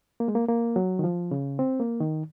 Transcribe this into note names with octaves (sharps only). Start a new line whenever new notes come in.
A#3
G#3
A#3
A#3
F#3
D#3
F3
C#3
C4
A#3
D#3